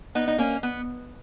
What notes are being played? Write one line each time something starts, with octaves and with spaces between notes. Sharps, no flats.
B3 D#4
D#4
A#3 C#4
B3